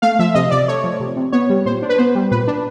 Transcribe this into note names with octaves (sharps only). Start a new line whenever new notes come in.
A3 F5
F3 E5
C3 D#5
C3 D5
A3 C#5
F3
C3
C3
B3 C#5
G3
A#2 C5
D4
B4
B3 C5
G3
A#2 B4
D4